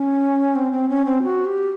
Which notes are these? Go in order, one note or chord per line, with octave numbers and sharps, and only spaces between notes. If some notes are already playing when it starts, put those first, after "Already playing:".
Already playing: C#4
C4
C4
C#4
C4
F#4
G4